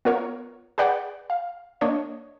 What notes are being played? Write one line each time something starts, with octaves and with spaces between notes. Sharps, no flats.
B3 F4 A#4 C#5
G#4 B4 D5 F#5 G5
F5
A#3 D4 C#5 D#5